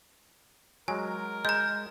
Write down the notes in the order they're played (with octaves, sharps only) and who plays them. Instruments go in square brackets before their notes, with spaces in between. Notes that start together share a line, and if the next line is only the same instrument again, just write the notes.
[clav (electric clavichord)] F#3 G#3 [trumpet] A#4 [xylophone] G#5
[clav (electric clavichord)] G#3 [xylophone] D#5 A#5 [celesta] G6